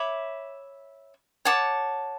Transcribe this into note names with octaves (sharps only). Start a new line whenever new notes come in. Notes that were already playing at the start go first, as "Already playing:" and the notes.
Already playing: C#5 E5 B5 D6
C#5 F#5 A5 D6